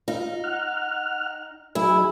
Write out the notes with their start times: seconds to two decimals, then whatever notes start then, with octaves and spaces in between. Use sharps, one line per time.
0.08 D#4 F4
0.44 F#5 F6
1.75 F#3 D#4 E4 G#4